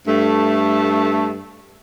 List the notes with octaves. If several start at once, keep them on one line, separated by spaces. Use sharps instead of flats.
G2 A3